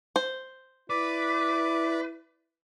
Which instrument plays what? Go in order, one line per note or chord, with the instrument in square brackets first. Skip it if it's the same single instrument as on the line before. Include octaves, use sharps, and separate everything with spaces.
[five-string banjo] C5
[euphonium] E4 [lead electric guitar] B4 [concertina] D5 D6